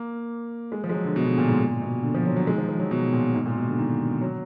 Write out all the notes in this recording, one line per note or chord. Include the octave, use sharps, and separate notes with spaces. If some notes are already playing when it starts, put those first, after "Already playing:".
Already playing: A#3
G#3
F3
G#3
F#3
D3
B2
D3
A#2
G#2
A#2
B2
D3
F3
F#3
F#3
G#3
D#3
F3
F3
F#3
B2
A#2
G#2
A#2
B2
D3
D#3
F#3